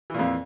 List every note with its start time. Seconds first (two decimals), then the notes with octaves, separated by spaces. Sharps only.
0.10 E3
0.14 A#2
0.19 F2